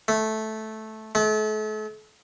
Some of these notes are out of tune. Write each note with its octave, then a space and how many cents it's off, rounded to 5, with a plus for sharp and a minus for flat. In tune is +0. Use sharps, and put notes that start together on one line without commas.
A3 -10
A3 -40